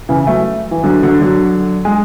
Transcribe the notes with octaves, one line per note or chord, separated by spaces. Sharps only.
C#3 E3
F#3 A3
E3
D3 F#3
D3 F#3
D3 F#3
G#3